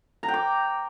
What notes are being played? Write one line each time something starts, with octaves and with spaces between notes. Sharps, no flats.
A#5
G5
D6